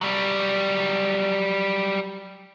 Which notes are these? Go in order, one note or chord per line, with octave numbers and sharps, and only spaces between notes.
F#3 G3